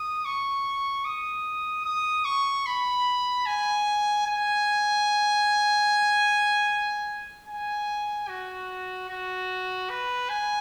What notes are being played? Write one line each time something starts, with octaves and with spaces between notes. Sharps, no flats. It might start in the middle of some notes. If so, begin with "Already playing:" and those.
Already playing: D#6
C#6
D#6
D#6
C#6
B5
G#5
G#5
G#5
F#4
F#4
B4
G#5